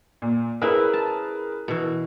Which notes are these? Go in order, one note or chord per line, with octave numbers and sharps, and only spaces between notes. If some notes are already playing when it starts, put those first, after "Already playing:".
A#2
C#4 E4 G#4 A#4 B4
A5
B2 E3